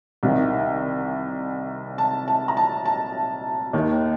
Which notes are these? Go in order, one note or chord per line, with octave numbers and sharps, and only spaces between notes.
C2 C3 D#3
A5
A5
A#5
A5
A5
D#2 D#3